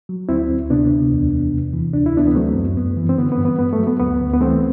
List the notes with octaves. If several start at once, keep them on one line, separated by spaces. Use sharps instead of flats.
F#3
D2 C4 E4
D2
C3 B3 D4
D2
E2
E2
C3
E3
D2 D4
E4
D2 B3 D4
B3
F#3 A3 C4
F#2
G2 B3
E3
C4
D3 B3
B3
G2
B3
G2 B3
A3
F#3
B3
D2 B3
D2
B3
E3 A3 C4